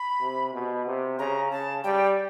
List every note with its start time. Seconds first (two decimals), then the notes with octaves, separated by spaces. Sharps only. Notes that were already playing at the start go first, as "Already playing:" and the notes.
Already playing: B5
0.21 C3
0.53 B2
0.86 C3
1.19 C#3 A#5
1.51 C#3 A5
1.84 G3 G5